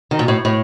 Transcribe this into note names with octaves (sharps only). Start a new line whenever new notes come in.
D#3
A#2
A2
A2